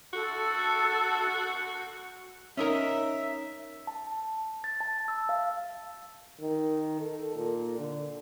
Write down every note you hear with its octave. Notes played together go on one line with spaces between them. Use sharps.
F#4 A4
C#4 D#4 A#4 E5
A5
A6
A5
E6
F5
D#3
A4
A#2
D3